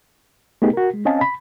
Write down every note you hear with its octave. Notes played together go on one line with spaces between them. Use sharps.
A3 B3 D#4 G4 G#4
F#4 A#4
G#3
C4 C#4 D#5 F5 G#5 A5
B5